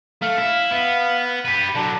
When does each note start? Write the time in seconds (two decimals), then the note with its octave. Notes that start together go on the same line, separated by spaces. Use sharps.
0.22 A3 F5
0.38 E4
0.71 B3
1.45 G4 B4
1.75 D3 F#3 D4